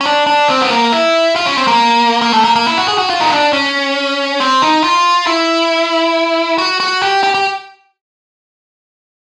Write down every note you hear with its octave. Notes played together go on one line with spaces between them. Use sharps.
C#4
D4
D4
C4
B3
A#3
E4
F4
C#4
C4
A#3
A#3
A3
A#3
A#3
E4
F#4
G#4
F#4
F4
D#4
D4
C#4
C4
D#4
F4
E4
F#4
F#4
G4
G4
G4